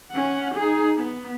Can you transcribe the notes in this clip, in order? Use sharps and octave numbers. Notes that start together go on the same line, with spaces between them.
C#4 F#5
D#4 G#4
B3